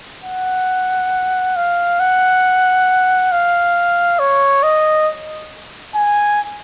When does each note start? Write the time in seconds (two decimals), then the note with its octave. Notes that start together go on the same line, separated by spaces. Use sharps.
0.24 F#5
1.56 F5
2.00 F#5
3.32 F5
4.19 C#5
4.63 D#5
5.95 G#5